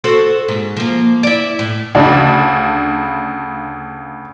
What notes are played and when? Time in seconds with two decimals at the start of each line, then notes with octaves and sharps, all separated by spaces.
0.04 F#4 A4 C5
0.48 G#2
0.77 F3 A#3
1.23 E4 D5
1.59 A2
1.95 D2 C#3 D4